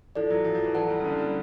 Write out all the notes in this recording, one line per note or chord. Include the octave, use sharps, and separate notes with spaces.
F3 E4 A4 D5
F#3
F3
F3
E3
F#3 E4 A4 D5 F#5 A5
G3
C#3
D3
G3